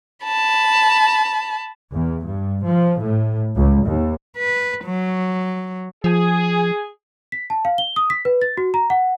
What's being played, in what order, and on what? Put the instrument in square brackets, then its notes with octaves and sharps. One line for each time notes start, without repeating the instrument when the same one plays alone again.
[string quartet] A5 B5
[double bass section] E2
G2
F3
A2
C#2
D#2
[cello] B4
F#3
[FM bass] F3 [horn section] G#4
[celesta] B6
A5
F5
G7
D#6
B6
B4
A6
F#4
A#5
F#5